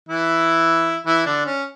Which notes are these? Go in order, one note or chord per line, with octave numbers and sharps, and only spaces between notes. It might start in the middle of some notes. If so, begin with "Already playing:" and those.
E3 E4
E3 E4
D3 D4
C#4